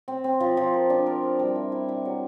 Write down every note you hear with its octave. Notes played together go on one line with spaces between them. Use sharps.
C4
C4
F3
F3
A#4
D4
A#4
A#4
G3
E4
E4
E4
F#3